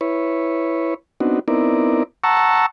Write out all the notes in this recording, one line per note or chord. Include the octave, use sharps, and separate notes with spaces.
E4 B4 C#5
B3 C4 D4 D#4 F#4
B3 C4 D#4 E4 A#4 D5
F#5 A5 A#5 C#6 E6